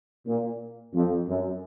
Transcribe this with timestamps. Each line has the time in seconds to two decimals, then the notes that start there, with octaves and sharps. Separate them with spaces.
0.26 A#2
0.94 F2
1.27 F#2